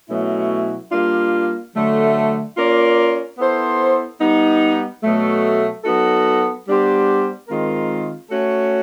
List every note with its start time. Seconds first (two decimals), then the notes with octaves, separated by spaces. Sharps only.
0.09 B2 F#3 A3 C#4 E4
0.92 G3 A#3 D4 F4
1.74 D3 F#3 A3
2.56 A#3 C#4 F4 A#4 D5
3.38 B3 E4 A4 C5
4.20 G3 B3 D#4
5.03 B2 F#3 A3
5.84 F#3 B3 D#4 F#4 A4
6.67 G3 B3 D4 G4 C5
7.48 D#3 G#3 C4 F4 A#4
8.31 A3 C#4 F#4 A4 C#5